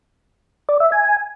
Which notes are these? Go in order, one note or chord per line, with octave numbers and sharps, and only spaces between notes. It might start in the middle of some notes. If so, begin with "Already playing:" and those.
D5
E5
G#5